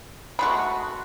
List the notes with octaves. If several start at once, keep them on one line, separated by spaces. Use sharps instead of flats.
G#3 A3 F#4 B5